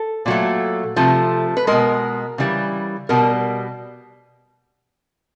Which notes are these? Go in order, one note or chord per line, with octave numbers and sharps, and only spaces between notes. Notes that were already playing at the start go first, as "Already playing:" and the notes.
Already playing: A4
A#2 F#3 A3
C3 F3 A3
B4
B2 G#3 A#4
C#3 E3 G3
B2 G3 A#4